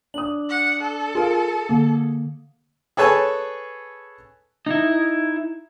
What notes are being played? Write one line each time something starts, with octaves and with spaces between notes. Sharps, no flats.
D4 D#6 F#7
F#5
A4
F4 G#4 A#4 F5
D3 A#3
G#4 A4 B4 C#5 G#5 A5
D#4 E4